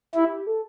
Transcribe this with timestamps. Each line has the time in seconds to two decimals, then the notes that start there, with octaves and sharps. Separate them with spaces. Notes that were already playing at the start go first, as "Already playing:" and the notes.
0.15 E4 G4
0.47 A4